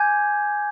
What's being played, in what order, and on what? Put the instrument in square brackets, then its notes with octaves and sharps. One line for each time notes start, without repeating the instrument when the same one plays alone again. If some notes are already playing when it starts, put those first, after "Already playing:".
Already playing: [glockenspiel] G#5 D6 G6 G#6